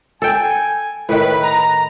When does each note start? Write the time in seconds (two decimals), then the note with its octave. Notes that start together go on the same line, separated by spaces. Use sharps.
0.22 A4 G5 G#5
1.09 A2 D#3 B4
1.43 A#5